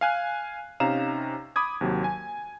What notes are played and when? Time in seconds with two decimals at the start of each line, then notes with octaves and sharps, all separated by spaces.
0.01 F5 G#5 F#6
0.80 C3 C#4 D#4 F5 A#5 E7
1.56 B5 D6 D#6 G#6
1.81 D#2 C3 F#3
2.04 G#5